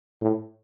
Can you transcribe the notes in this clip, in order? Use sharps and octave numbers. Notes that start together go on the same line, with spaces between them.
A2